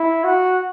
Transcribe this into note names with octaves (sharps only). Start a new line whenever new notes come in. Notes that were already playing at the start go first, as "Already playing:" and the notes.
Already playing: E4
F#4